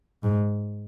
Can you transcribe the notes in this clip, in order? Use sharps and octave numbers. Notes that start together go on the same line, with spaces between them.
G#2